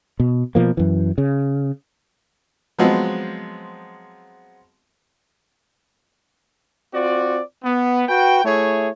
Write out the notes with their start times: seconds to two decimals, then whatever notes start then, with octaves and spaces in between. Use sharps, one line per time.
0.20 B2
0.55 B2 F3 A#3
0.77 F#2 E3
1.18 C#3
2.79 F3 F#3 G#3 B3 C4
6.94 C4 F4 F#4 D5
7.64 B3
8.09 F#4 B4 G5
8.45 A3 E4 G#4 C#5